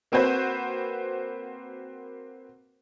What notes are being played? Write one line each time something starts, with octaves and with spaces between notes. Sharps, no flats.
A#3 C4 F#4 B4 C5